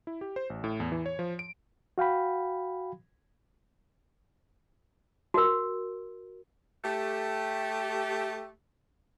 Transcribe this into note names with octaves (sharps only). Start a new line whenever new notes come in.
E4
G4
C5
A1
A2
E2
E3
C#5
F3
D7
F#4 F5 G5 B5
F#4 A#4
A3 G4